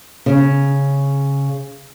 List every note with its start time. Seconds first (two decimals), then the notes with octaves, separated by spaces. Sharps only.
0.26 C#3 C#4